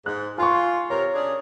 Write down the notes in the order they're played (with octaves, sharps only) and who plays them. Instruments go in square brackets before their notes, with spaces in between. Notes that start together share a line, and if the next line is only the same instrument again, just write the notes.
[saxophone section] G#2 [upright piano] F#6
[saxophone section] F4 [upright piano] G#5 C6 C#6
[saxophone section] C3 A#4 [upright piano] C#5
[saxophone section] C#3 D4 G#4